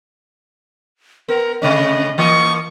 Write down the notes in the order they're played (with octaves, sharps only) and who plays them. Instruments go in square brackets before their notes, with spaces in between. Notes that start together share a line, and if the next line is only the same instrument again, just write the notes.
[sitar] B3 [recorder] A#4
[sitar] C3 A3 C#4 [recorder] D#5
[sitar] E3 A#3 D#5 [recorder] C#6